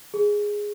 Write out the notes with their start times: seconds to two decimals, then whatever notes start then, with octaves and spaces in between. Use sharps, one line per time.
0.14 G#4